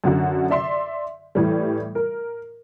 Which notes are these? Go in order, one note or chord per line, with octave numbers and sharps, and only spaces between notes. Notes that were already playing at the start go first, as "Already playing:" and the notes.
F#2 D3 F#4
D5 E5 C6
A2 E3 G3
A#4